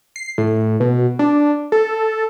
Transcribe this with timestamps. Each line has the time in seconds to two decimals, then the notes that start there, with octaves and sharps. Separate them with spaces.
0.16 C7
0.38 A2
0.80 B2
1.19 D4
1.72 A4